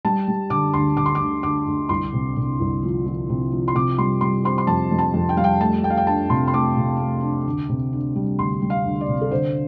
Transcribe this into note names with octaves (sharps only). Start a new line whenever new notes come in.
G3 A5
G3
D3 D6
D2 C6
D3 D6
C6
D6
D2
D2 D6
D2
C2 C6
C3
C3
C2
F3
F3
C3
F3
C6
C3 D6
G3 C6
G3 C6
C4 C6
C6
F2 A5
F2
A5
F2
G5
G3 F5
G5
A3 A5
A3 G5
F5
G5
D4 A5
C3 C6
C6
A3 D6
C3
A3
D4
D2
C3
D4
G3
D2 C6
G3
F5
D2
D5
C3
A4
D3 C5